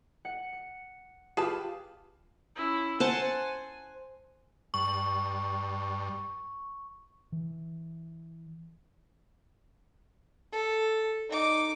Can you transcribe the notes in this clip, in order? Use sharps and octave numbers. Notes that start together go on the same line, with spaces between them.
F#5 C#7
C#7
F4 G4 G#4 B4 F5 A5
C#4 E4
C5 F#5 G#5 A5
G2 C#6
E3
A4
D#4 D6